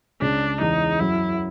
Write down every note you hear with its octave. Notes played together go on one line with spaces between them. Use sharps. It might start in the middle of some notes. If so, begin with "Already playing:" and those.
C#2 C#3 D4
E2 E3 D#4
F#2 F#3 E4